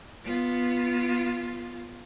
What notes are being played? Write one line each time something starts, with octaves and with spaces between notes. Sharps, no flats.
B3 F4